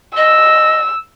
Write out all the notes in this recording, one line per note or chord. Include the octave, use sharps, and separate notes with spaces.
D#5 E6